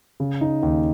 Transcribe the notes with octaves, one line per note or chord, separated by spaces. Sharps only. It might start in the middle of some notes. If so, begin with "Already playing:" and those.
C#3
D#4
D#2